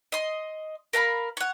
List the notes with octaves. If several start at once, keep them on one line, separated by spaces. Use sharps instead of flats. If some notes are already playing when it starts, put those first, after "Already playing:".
D#5 C6
A#4 F5 A5 B5
C#5 F#5